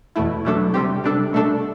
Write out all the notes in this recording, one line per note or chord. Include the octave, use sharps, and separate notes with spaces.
E2 B2 A3 E4
B2 F#3 A3 D4 A4
C3 G3 C4 G4
C3 G3 D4 A4
B2 A3 D4 A4